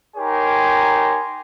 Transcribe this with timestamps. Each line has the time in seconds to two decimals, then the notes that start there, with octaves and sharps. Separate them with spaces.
0.16 D#4 G4 A#4 C#5 G#5 C6